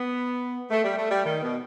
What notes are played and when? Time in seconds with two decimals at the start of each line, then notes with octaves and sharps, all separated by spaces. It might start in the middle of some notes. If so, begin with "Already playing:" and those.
Already playing: B3
0.71 A3
0.83 G3
0.97 A3
1.11 G3
1.25 D#3
1.42 B2